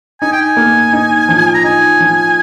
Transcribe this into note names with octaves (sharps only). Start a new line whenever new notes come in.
D#4 G#5
G5
G#5
A#3
D#4
F3
A#5
D#4 G#5
F3